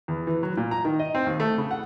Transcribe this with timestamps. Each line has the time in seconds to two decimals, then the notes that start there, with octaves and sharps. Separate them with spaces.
0.08 E2
0.27 E3
0.43 F#3
0.57 A#2
0.71 A#5
0.85 D#3
0.99 D#5
1.15 C4
1.26 D#2
1.40 A3
1.58 C#3
1.71 F#5